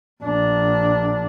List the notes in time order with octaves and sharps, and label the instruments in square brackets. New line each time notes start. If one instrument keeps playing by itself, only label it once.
[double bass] A#1 D4